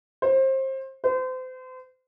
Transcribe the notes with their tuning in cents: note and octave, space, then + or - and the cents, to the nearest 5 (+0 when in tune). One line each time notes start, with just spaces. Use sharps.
C5 +25
C5 -35